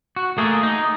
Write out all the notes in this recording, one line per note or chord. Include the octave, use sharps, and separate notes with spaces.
F#4
A3 A#3 G#4
D#4